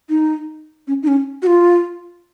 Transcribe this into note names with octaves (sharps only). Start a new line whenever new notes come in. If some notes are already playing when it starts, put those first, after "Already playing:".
D#4
C#4
D#4
C#4
F#4
F4